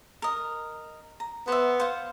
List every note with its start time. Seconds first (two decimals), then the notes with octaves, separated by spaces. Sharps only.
0.22 A#4 D#5
1.20 A#5
1.48 B3 C5 E5
1.80 C5 F5 F#5